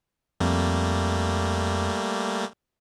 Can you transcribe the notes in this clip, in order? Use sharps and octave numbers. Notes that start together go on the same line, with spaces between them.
F2 G3 A3 A#3